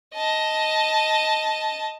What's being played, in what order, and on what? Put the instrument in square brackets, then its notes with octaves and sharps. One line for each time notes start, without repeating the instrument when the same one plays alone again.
[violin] D#5 A5